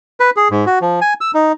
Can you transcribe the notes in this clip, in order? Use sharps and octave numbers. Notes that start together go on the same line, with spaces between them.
B4
G#4
G#2
F#4
F3
G#5
E6
D#4